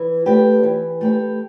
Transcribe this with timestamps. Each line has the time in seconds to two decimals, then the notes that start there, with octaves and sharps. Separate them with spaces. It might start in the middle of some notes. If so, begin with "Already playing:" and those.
Already playing: E3
0.26 A3 G4 B4
0.63 E3
1.01 A3 G4 B4